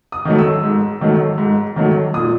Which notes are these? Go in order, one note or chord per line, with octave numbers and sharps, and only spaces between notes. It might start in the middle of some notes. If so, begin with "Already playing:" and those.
D#6
D#3 F#3 A3
E6
G#2
D#3 F#3 A3
G#2
D#3 F#3 A3
A#2 D#6